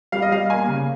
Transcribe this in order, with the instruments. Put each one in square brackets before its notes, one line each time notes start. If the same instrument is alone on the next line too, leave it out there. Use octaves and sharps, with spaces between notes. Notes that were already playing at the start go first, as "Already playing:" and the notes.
[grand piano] G3 F5
D#5
G3 F5
A#3 G#5
C#3